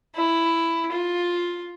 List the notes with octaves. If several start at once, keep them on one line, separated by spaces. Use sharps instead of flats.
E4
F4